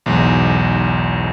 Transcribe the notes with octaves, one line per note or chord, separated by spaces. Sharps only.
B1 E2 G#2